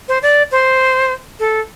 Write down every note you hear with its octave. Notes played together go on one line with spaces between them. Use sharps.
C5
D5
C5
A4